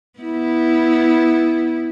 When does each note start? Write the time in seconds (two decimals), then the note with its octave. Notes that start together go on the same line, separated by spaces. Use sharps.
0.20 B3 E4